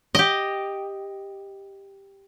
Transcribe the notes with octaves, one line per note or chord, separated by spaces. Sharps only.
G4 D#5